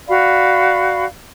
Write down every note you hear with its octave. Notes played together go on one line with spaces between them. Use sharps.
F#4 D5 F5 B5